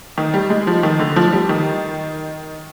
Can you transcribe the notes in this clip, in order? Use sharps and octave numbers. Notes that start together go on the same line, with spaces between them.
D#3
G3
G#3
F3
D#3
D3
F3
F3
G3
D#3